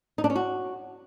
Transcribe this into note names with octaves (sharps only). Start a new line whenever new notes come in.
D#4
D4
C#4
F#4